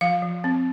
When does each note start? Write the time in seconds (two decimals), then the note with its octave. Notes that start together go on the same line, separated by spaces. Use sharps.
0.01 F3 F5
0.22 F3
0.44 C4